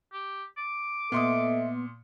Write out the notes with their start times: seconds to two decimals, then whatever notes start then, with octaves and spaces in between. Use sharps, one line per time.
0.13 G4
0.58 D6
1.12 A#2 B3 A4 D#5 E5 C6 D#6